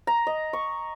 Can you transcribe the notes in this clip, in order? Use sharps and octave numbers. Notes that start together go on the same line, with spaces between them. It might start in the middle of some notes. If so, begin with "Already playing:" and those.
A#5
D#5
C#6